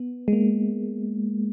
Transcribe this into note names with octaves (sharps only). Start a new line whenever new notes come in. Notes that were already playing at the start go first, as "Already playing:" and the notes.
Already playing: B3
G#3
A#3